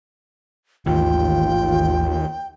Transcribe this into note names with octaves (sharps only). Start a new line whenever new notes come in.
A1 D#2 G#2 D#3 F4 G5